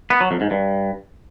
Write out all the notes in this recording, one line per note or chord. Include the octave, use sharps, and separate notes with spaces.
B3
F#3
F2
G#2
G2